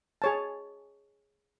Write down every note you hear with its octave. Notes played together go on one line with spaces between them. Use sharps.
G#4 C#5 A5